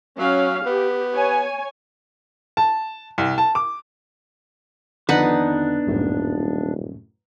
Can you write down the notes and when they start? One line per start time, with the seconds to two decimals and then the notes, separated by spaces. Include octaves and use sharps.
0.19 F#3 C#4 F5
0.66 B3 G4
1.14 C#5 G#5
2.57 A5
3.18 C2
3.38 A5
3.55 D6
5.09 F2 D3 D#3 B3 D4 D#4 B4 F#5
5.86 D#1 C2 F#2 A2